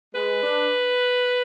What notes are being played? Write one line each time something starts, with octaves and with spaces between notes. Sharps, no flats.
G#3 B4
D4